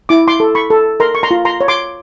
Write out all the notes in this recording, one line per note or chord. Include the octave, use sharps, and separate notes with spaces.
E4 D6
C6 D6
A4
B5 C#6
A4
A#4 A#5 C6
C#6
A#5 C6
F4
A#5 C6
C#5
C6 D6